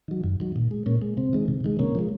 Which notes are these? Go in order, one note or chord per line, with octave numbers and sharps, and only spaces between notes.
D#3 F#3
F#2
D#3 F#3
A#2
G#3
A#2 A#3 C#4
G#3
C3 C4
D#3 G#3
C3
D#3 G#3
C3 A#3 C#4
F3 G#3